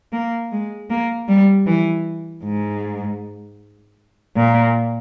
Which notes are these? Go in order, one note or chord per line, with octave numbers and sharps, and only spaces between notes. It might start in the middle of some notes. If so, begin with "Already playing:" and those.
A#3
G#3
A#3
G3
E3
G#2
A#2